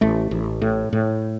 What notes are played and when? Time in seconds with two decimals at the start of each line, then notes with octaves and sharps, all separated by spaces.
0.01 A1 A3
0.31 A1
0.62 A2
0.93 A2